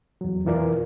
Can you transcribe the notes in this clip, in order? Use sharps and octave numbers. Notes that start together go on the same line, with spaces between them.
E2 F#3
F2 B2 E3 F4 A#4 D5